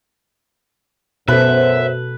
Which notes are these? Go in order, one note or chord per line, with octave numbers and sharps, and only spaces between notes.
F#2 B2 A4 B4 C5 E5